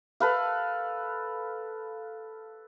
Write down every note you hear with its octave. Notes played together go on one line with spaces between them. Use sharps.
A4 B4 F5